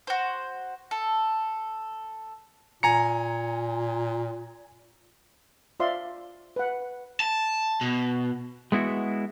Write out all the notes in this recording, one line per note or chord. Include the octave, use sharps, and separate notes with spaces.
F#4 C5
A4
A#2 G#5 A#5 C#7
F4 C5 D5 E5 F5 C6
B4 F#5
A5
B2
G#3 B3 E4 F#4